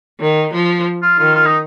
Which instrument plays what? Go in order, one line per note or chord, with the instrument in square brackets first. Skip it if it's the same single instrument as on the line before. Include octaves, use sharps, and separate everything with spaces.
[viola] D#3
F3
[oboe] F4
[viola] D#3 [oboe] F4
[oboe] F4
D#4